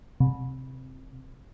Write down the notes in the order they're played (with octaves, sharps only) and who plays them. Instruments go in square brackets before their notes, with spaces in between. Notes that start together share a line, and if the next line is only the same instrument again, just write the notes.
[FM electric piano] C3